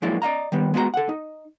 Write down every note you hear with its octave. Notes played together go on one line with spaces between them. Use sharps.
F3 F#3 G#3 A#3 E4 D5
D5 D#5 F5 A#5
D#3 G3 B3
G#3 B3 F#4 D5 A#5
A4 F#5
D#4